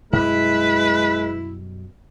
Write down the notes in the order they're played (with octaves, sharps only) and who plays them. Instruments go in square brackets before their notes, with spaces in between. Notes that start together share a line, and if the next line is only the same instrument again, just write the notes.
[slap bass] F#2 B2 G3 [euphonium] G#3 [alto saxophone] E4 [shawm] B4